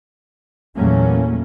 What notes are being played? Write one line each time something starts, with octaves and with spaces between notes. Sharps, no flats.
E2 A#2 F#3 A3 A#3 C#4